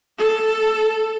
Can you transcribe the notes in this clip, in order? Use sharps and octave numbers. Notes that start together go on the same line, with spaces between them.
A4